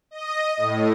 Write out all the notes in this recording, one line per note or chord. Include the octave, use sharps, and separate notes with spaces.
D#5
A2